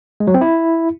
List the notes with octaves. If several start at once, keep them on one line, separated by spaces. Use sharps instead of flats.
G#3
F#3
C4
E4